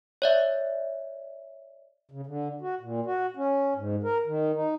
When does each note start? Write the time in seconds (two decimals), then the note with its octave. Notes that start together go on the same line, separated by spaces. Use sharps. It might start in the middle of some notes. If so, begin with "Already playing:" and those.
0.22 C#5 D5 E5
2.11 C#3
2.26 D3
2.61 F#4
2.81 A#2
3.06 F#4
3.37 C#4
3.76 G#2
4.03 A#4
4.27 D#3
4.54 D#4